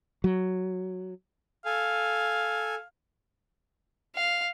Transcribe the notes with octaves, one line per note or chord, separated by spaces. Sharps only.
F#3
A4 F5 G#5
F5